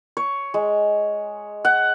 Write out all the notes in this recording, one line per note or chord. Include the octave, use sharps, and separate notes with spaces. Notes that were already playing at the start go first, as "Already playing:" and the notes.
C#5
G#3
F#5